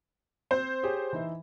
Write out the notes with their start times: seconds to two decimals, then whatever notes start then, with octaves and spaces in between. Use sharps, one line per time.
0.51 C4 C5
0.83 G4 G#4 C#5
1.13 E3 D#4 E5